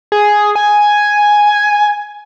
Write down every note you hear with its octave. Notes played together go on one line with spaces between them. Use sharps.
G#4
G#5